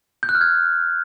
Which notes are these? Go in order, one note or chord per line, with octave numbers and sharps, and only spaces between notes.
G6
F#6
F6
G#6